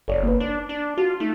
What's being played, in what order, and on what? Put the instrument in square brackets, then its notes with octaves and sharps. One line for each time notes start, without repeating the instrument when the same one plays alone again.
[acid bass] F#1 [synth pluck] A4 C#5 D5
[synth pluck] A#3 B4
[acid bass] D4
D4
[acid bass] F4 [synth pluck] F#4
[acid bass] A3 [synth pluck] D#4